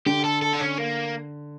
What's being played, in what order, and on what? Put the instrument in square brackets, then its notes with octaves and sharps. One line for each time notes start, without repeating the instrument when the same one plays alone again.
[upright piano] D3 [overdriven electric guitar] G4
[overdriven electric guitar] A4
A4
D4
C#4
A#3